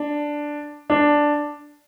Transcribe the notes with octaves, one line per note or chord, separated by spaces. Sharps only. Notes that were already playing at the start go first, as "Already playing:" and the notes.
Already playing: D4
D4